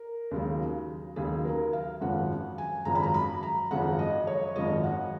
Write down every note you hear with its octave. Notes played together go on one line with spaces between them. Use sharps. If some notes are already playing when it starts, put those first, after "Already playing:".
Already playing: A#4
D#2 C#3 F#3
D#2 C#3 F#3 G#4
A#4
F5
G#1 F#2 C#3 F3 F#5
G#5
G#1 F#2 C#3 F3 A#5
B5
A#5
B5
A#5
G#1 F#2 C#3 F3 F#5
D#5
C#5
G#1 F#2 C#3 F3 D#5
F#5